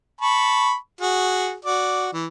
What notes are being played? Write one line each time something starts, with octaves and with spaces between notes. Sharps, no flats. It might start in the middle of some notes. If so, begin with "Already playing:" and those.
A5 B5 C#6
F#4 G#4
F#4 D5
E3